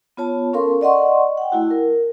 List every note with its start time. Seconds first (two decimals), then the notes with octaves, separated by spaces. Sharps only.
0.17 B3 F4 C#5 A5
0.53 C#4 A4 A#4 F5 C6 C#6
0.81 D5 D#5 F#5 C6 C#6
1.38 F#5 G5
1.52 A3 E4 F#4
1.71 A#4